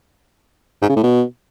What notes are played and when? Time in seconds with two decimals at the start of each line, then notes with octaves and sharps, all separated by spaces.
0.82 G#2
0.89 C#3
0.96 A2
1.03 B2